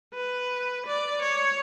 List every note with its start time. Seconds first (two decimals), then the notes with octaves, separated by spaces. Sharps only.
0.14 B4
0.86 D5
1.22 C#5